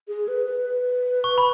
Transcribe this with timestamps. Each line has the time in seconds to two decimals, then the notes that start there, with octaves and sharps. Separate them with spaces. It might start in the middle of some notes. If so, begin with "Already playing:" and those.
0.08 G#4
0.28 B4
0.47 B4
1.24 C#6
1.38 B5